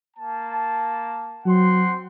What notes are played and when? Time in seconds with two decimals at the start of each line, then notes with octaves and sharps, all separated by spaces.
0.17 A#3 A5
1.46 F#3 C4 F#5 C6